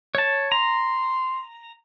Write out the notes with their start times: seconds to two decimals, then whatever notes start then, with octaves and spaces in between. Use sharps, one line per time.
0.15 C#5 A5
0.52 A#5 C6